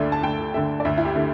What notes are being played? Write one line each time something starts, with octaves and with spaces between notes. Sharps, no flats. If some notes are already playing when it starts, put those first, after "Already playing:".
Already playing: D2 D3 A3 D5 E5
A5
D2 G5
D3 A3 E5
D5
D2 E5
E4
G4
D3 A3